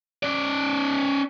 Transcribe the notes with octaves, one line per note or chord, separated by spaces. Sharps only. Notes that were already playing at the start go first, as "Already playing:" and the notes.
C#4 D5